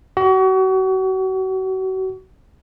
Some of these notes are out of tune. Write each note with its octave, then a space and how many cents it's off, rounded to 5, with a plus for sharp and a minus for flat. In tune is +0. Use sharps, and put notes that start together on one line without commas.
F#4 +35